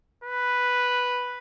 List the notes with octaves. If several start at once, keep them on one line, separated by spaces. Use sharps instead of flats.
B4